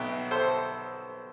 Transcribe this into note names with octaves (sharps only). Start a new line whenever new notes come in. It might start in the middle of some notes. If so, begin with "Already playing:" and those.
Already playing: B1 B2 B3 E5 G5
A4 C5